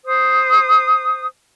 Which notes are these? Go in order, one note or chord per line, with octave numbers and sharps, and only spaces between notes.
C5 D#6